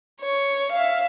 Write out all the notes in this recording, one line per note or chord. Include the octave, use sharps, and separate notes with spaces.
C#5
E5 F5